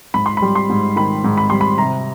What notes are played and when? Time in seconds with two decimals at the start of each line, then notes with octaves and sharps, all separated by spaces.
0.14 G#2 B5
0.26 C6
0.37 G3 B5
0.55 C6
0.70 G#2
0.96 D#3 B5
1.24 G#2
1.38 B5
1.50 G3 C6
1.61 B5
1.78 C3 A#5